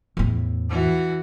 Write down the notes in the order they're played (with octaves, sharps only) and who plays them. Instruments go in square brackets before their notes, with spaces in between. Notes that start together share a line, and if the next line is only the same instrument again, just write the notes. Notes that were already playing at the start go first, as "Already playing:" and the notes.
[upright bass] E2 A2
[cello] E3 F#4